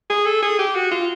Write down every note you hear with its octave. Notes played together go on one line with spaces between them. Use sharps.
G#4
A4
G#4
G4
F#4
F4